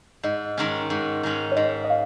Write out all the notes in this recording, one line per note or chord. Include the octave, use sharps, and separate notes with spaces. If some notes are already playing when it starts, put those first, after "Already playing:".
G#2 D#5
D#3 G#3 C#4
G#2
D#3 G#3 C#4
C#5
G#2 D#5
D#5
F5